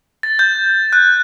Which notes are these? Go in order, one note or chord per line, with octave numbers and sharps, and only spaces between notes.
A6
G6
F#6